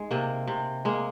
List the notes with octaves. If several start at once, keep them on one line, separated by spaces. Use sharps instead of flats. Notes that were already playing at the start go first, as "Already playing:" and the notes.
Already playing: G#3 D#4
C3 A#3
C3
G#3 A#3